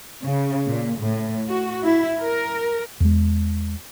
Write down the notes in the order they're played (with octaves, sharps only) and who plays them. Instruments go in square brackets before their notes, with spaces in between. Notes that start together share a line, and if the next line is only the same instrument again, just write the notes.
[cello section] C#3
A#2
A2
F#4
E4
A#4
[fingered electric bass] E2 G#3